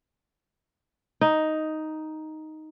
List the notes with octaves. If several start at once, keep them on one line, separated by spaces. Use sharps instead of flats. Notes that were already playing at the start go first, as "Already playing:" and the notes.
D#4